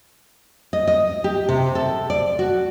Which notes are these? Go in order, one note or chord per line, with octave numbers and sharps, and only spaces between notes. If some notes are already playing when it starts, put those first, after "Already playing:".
D#5
D#5
G4
C3
A4
D5
F#4